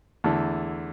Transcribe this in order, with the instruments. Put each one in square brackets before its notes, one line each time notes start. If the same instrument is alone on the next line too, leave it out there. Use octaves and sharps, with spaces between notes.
[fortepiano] E2 D3 A3 E4 A4